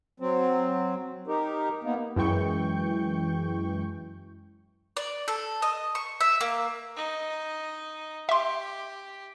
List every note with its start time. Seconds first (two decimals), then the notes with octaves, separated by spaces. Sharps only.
0.20 F#3 C4
1.27 D#4 G4 A#4
1.83 A#3 B3 D#4
2.16 F#2 E3 G#3 G5 C#6 G6
4.97 D5
5.28 A4
5.62 D#5
5.95 C#6
6.20 E5
6.41 A#3
6.97 D#4
8.29 G4 E5 C6